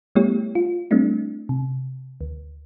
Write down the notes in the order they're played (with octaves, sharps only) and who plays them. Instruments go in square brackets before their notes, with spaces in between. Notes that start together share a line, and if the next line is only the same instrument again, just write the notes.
[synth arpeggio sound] G3 A3 B3 E4 G4 C#5
F4
G3 A3 C4 D4 E4
C3
D2